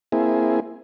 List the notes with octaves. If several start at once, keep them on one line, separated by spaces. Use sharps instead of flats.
A#3 C4 E4 G#4